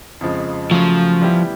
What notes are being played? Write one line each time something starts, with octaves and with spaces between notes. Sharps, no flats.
F2 C#3 F3 G#3
C#3 F3 F#3 A3 C#4
E3 G3 B3 E4 G4